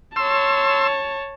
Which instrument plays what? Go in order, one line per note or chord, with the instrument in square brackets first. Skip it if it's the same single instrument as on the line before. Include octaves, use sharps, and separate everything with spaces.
[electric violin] C#5 A5 [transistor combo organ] C6 E6